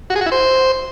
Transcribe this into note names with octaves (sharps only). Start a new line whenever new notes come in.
F#4
G#4
F#4
E4
C5